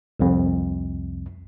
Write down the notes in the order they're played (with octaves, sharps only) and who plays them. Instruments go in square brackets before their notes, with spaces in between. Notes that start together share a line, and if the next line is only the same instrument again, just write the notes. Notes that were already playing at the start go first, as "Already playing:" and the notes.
[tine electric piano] C2 F2